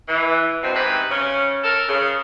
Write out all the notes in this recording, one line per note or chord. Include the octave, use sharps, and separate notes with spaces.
E3
G2 B2 C4
G#2 C3 C4 B4
C#3 C#4
A4 A#4
C#3